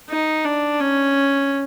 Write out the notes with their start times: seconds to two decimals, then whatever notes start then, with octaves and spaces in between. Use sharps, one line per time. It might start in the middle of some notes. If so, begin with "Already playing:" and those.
0.10 D#4
0.45 D4
0.80 C#4